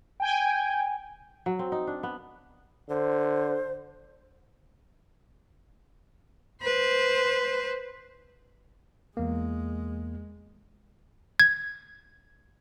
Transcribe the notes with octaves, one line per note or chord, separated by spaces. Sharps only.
G5 G#5
F#3
C4
D#4
D4
B3
D3 C5
B4 C5
E2 G#3 A#3
G#6